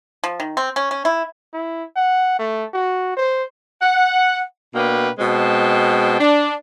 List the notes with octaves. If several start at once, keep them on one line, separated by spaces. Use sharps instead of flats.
F3
D#3
C4
C#4
C#4
E4
E4
F#5
A3
F#4
C5
F#5
B2 A#3 D4 B4 G5
B2 G#3 C4 G5 A5
D4